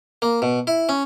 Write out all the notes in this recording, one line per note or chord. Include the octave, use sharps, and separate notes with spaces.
A#3
B2
E4
C#4